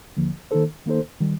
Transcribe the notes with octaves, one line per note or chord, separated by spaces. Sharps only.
D#2 D3 F3 A#3
D#3 A#3 D#4 A4 C5
D#3 A#3 D#4 A4 C5
D#3 G3